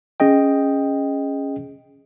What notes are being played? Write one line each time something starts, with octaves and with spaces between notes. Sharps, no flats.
C#4 G#4 D#5 G5